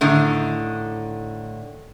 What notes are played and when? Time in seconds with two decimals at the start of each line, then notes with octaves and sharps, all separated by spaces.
0.01 A2 D3 D#3